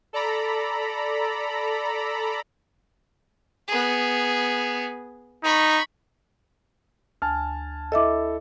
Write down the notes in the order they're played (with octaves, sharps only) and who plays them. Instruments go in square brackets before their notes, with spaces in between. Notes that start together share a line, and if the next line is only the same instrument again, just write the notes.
[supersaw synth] A4 D5 A#5 B5
[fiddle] B3 G#4
[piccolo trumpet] D#4 [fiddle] B5 C#6
[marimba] D2 [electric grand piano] G#5 A5 F6
[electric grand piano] E4 A4 [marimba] D#5 E5 D6